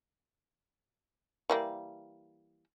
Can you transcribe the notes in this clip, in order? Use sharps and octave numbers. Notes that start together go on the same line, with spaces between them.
E3 G3 A#3